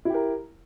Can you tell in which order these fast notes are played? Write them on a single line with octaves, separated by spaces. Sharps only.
E4 G4 A#4